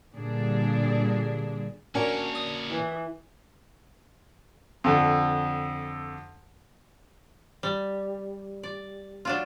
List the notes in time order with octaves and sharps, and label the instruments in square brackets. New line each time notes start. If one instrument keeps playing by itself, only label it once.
[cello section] A#2 D3 G3 D4 G#4
[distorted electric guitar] A#3 C#5 [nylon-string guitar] C#4 D4 F#4 [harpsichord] A#4 G#5
[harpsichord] D#6
[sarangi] E3
[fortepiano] F2 D3
[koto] G3
D5
F#3 D4 F4